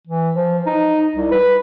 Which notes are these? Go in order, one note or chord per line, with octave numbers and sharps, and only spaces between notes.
E3
F3
D#4
C2
B4